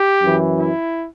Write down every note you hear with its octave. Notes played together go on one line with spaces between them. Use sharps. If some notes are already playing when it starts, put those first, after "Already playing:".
Already playing: G4
F#2 E3
E4